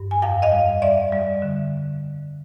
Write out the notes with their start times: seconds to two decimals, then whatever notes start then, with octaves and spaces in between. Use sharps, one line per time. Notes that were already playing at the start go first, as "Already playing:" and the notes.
Already playing: G2
0.11 G#5
0.22 F2 F5 G5
0.42 D#5 F5
0.52 G3
0.82 G3 D5 E5
1.12 G3
1.42 D3